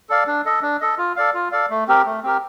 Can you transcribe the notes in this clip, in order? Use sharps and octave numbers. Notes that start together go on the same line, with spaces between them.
A4 D5 F5
D4
A4 D#5
D4
A4 D#5
F4
A4 D5 F5
F4
A4 D5 F5
A3
C4 G4 A#4
A3
C4 G4 A#4